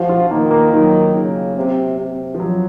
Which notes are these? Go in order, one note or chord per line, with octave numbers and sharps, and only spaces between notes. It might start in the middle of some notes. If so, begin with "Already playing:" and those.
Already playing: F3 F#4
F4
D#3 A#3
A#3
D#3 F#3
C#3
C3
C3
F3
F#3